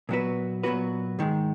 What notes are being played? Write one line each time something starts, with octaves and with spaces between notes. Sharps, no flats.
A#2 F#3 B3 F#4 B4
A#2 F#3 B3 F#4 B4
G#2 D#3 G#3